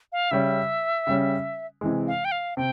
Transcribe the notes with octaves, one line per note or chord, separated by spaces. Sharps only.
F5
C#3 G3 C#4 E5
C#3 G3 C#4
C3 E3 G#3
F5
G5
F5
C3 G5